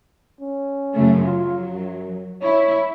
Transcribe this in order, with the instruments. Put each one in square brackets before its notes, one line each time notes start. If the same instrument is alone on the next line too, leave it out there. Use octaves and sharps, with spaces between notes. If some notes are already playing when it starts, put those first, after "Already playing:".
[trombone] C#4
[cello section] F#2 C#3 A3
[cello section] F#3 [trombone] F4
[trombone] F#2
[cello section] E4 [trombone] C#5